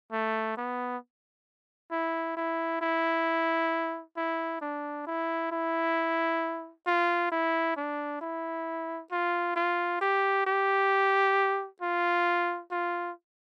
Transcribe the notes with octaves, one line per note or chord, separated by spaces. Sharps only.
A3
B3
E4
E4
E4
E4
D4
E4
E4
F4
E4
D4
E4
F4
F4
G4
G4
F4
F4